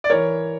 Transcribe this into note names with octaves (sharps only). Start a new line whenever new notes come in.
D5
E3 A#4 C#5